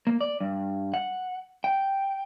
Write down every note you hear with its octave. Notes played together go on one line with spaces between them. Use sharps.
A#3
D5
G2
F#5
G5